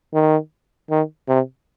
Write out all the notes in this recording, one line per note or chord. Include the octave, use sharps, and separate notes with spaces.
D#3
D#3
C3